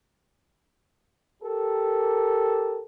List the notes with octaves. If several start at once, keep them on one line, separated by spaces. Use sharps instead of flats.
G4 A4 A#4